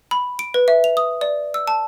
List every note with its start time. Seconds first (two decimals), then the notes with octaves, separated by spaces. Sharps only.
0.11 B5
0.39 D7
0.54 B4
0.68 E5
0.84 F7
0.97 D#6
1.21 D5
1.54 E6
1.67 A5